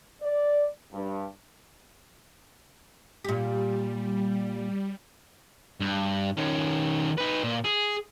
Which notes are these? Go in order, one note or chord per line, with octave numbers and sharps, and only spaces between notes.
D5
G2
A#2 G3 G4
G2
D#3 C#4
D#4 B4
A#2
G#4